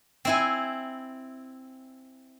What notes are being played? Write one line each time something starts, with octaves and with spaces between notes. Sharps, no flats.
C4 E4 G#5